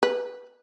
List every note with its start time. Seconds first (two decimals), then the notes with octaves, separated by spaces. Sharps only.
0.03 B4